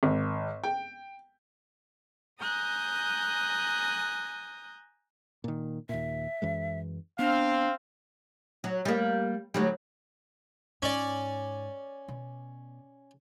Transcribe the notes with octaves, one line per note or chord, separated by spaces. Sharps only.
G#1
G5
G#5 A#5 D#6 F#6 G6 A#6
A#2 D#3
D#2 A#2 E5
F#2 E3 G#3
B3 C4 D4 F5
F#3
G3 A#3
D2 F#3 G3
G#2 C#4 D5
B2